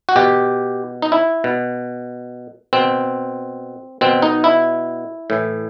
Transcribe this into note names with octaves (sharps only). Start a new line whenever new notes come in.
F#4
B2 G4
D#4
E4
B2
B2 C4
B2 C4
D#4
E4
A2 E3